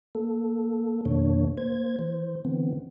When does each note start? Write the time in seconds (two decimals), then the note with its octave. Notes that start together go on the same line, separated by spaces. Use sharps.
0.15 A#3 A4
1.05 F2 B2 D#3 A#3 D4 C#5
1.57 A#3 C5 G#6
1.99 E3 C5
2.45 D3 E3 B3 C4